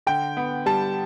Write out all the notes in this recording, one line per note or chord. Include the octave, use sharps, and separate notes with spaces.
D3 G5
B3
G3 A5